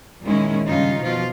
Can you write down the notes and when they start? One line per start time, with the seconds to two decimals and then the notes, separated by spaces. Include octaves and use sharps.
0.23 A#2 D#3 G#3 C#4 E4
0.68 G2 C#3 D#4 F4
1.00 B2 F3 F4